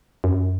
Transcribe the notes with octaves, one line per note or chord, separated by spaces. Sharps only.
F#2